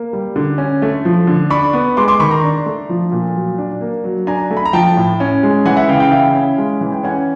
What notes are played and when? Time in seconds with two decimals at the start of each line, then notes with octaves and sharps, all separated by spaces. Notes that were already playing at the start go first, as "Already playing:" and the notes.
Already playing: A#3
0.13 G3
0.36 D3
0.58 C#4
0.82 A3
1.05 F3
1.27 D3
1.50 D4 B5 C#6
1.73 B3
1.97 G#3 C6 D6
2.08 C6 D6
2.19 D#3 B5 C#6
2.31 A#5 C6
2.44 D4
2.66 A3
2.89 F3
3.12 A#2
3.35 F#3
3.58 D4
3.81 A#3
4.04 F#3
4.27 D4 G#5 A#5
4.51 A3
4.57 B5
4.65 A#5
4.73 F3 G5 A5
4.97 A2
5.20 C#4
5.43 G#3
5.65 E3 F#5 G#5
5.77 E5 F#5
5.89 C#3 F5 G5
6.00 F5 G5
6.11 E4 F5 G5
6.35 C#4
6.58 G#3
6.81 E3
6.92 G5
7.03 C#4 F#5 G#5